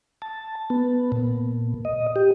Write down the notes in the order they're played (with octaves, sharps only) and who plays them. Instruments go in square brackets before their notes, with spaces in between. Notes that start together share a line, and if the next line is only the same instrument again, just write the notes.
[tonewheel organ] A5
B3
A#2
D#5
G4